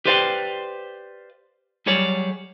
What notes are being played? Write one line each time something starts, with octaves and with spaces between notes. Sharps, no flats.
G4 B4 C5 D5 F5 G5
F#3 G3 G#4 C#5 D5